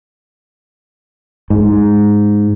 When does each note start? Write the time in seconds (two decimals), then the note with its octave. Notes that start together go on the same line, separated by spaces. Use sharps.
1.50 G#2